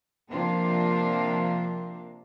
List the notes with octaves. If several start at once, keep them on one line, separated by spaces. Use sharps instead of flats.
C3 F3 A#3 D4 F4